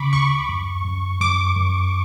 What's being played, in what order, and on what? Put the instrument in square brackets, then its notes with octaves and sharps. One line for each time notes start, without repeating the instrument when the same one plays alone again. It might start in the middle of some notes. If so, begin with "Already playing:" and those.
Already playing: [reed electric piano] C#3 [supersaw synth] B5 C#6 D6
[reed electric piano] D2 [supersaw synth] C#6
[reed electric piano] F#2
F#2
[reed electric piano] F#2 [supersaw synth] D6
[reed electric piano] F#2